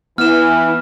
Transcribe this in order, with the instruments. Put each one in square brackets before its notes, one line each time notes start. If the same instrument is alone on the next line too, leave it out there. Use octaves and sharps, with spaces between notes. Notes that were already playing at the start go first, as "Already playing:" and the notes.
[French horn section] E3 [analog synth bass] B3 [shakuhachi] E4 [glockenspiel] F6 E7